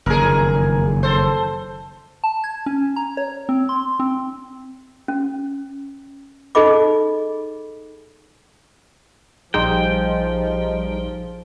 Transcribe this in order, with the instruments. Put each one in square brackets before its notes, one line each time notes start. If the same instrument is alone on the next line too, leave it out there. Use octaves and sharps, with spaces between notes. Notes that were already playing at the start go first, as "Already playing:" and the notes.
[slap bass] F#1 F2 D#3 [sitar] G#4 A#4
[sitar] A4 C5
[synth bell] A5
G#6
C#4
A#5
C#5
C4
C6
C4
[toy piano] C#4
D#4 G#4 A4 D#5 B5 D6
[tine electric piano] A#1 G#4 [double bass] F3 [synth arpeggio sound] G3 D#4 C5 [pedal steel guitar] G5